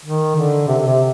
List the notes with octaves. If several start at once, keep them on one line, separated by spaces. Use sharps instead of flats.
D#3
D3
C3
C3